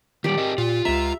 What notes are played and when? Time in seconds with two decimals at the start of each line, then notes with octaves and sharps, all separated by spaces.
0.24 D#3 G3 G4 D5
0.38 C4 A#4 D#5
0.58 A#2 F4
0.85 C#2 E5 A#5